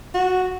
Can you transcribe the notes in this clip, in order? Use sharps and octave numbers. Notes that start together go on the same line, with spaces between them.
F#4